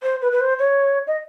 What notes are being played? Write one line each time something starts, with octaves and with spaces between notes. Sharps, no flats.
C5
B4
B4
C5
C#5
D#5